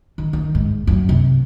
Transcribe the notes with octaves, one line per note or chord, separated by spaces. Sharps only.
D#3
D#3
G#2
F#2
C3